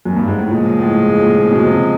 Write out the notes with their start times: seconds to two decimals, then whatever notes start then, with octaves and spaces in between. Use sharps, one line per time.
0.05 F#2
0.17 G2
0.28 G#2
0.39 A2
0.49 A#2 C#3 F3 G#3
0.79 A2
1.08 A2
1.22 A#2
1.37 A#2
1.52 B2
1.66 C3